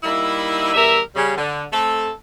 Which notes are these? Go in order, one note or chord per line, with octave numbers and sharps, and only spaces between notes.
G3 A#3 D#4 E4
E2 G3 A#4 E5
C#3 G3
D3
A3 C4 A4